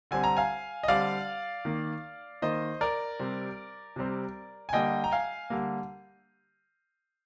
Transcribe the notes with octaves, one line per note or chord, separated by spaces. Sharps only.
D3 G3 C4 G#5
A#5
F5 G#5
D#5
D3 G3 C4 D5 F5
D#3 A#3
D#3 A#3 C5 D#5
A#4 D5
C3 G3 C4
C3 G3 C4
G#5
D3 G3 A#3 D#5 G5
A#5
F5 G#5
D3 G3 A#3